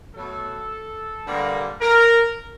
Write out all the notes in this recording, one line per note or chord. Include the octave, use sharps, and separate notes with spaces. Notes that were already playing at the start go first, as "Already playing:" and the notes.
B2 F#3 A3 A4
G2 D3 G3 A#3
A#4